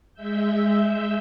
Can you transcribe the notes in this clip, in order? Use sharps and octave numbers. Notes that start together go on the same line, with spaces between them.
G#3 E5 E6 G6